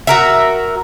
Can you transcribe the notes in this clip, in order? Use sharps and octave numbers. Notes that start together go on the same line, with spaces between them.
F#4 A#4 E5